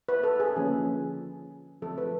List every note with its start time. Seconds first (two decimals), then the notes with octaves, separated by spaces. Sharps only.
0.09 B4
0.23 A4
0.40 G#4
0.56 D3 F3 A#3 C#4
1.82 D3 F3 A3 C4 A4
1.98 B4